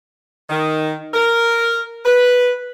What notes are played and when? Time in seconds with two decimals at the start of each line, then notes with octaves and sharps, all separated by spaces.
0.49 D#3
1.14 A#4
2.05 B4